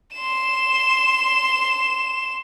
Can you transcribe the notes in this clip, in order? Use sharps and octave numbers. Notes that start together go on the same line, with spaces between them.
C6 E7